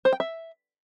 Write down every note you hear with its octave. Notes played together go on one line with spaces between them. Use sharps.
C5
G5
E5